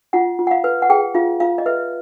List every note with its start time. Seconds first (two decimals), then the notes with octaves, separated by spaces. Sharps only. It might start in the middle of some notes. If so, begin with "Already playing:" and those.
0.13 F4 F#5
0.39 F4
0.47 F#5
0.51 F5
0.64 B4
0.82 F#5
0.90 G#4 G5
1.14 F4 F5
1.40 F4 F5
1.58 D#5
1.66 B4 E5